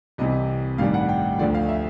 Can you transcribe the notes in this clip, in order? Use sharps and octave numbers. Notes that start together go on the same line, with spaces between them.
C2 C3 E3 D#5
A1 G2 D#3 G3 F5
F#5
G5
D2 D3 F3 D5
F5
E5